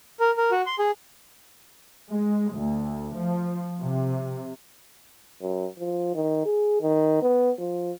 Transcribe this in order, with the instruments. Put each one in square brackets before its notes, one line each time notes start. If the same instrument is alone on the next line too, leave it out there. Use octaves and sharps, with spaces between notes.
[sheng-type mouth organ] A#4
A#4
F#4
C6
G#4
[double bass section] G#3
D2
F3
C3
[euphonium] F#2
F3
D#3
G#4
D#3
B3
F3